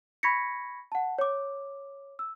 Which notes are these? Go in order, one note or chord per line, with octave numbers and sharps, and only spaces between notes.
B5 C#6 G#6 A#6 B6 C#7
F#5 A5
C#5 D6
E6